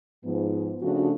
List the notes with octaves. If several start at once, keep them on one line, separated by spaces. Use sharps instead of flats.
G#2 F3 B3
C#3 F3 A3 D4 F#4